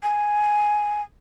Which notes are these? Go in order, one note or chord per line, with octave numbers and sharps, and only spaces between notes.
G#5